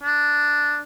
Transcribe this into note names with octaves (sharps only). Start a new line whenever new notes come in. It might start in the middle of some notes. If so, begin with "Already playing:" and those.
D4